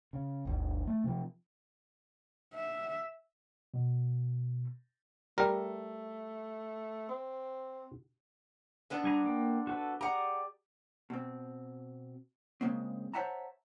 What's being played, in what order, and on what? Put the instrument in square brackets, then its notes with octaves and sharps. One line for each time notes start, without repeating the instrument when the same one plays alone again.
[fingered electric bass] C#3
G1 D2
A3
C3 F3
[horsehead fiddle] E5
[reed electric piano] B2
[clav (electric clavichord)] G3 A#4 [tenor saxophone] A3
[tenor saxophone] C4
[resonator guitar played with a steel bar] D3 B3 D4
[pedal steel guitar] G3 G#5 A#5
A#3 G5
F#4 A4 B4
[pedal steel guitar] G4 G#4 D5 [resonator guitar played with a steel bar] F#5 A#5
[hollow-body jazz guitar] B2 C4
C#3 G#3 A#3 C4
C5 C#5 E5 F#5 A5 A#5